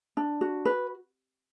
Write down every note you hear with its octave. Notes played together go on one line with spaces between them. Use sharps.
D4
F#4
B4